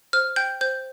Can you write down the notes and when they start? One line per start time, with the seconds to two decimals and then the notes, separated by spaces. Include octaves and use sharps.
0.13 C5 F6
0.36 G5 G6
0.61 C5 G6